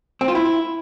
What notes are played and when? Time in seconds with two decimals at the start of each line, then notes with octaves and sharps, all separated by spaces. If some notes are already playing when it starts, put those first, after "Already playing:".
0.21 C4
0.28 F4
0.35 E4